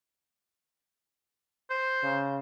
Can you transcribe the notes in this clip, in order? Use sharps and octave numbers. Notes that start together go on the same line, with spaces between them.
C5
C#3